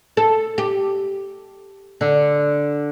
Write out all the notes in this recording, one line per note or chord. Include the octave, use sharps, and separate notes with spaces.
A4
G4
D3